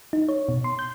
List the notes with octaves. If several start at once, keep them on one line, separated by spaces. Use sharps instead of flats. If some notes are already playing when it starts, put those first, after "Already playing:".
D#4
C#5
B2
C6
G6